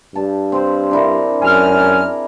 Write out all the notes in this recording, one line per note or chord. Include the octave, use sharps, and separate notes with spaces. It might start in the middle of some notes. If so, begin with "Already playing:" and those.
G2 A5
C4 C5
D4 E4 A#4
F#2 G#4 G#5 F6
A#4